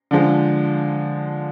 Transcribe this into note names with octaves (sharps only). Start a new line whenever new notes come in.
D3 F3 G#3